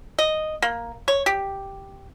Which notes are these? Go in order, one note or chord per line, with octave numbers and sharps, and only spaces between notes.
D#5
A#3
C#5
G4